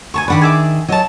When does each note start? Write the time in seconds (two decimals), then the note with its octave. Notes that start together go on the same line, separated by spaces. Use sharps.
0.14 D2 G#5 A5 C#6
0.28 D#3 D4 B4 D5 F#5 B5
0.42 G#4 E5 D6
0.88 F#3 C#5 D#5 A5